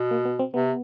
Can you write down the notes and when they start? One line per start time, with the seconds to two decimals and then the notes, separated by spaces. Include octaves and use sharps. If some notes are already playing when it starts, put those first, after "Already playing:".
Already playing: B2
0.11 A#3
0.25 B3
0.39 C4
0.54 C3 B3